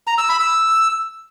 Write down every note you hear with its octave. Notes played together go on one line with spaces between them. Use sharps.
A#5
E6
B5
E6